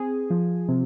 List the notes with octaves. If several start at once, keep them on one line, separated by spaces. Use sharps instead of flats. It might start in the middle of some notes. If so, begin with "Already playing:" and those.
Already playing: C4 G#4
F3
C3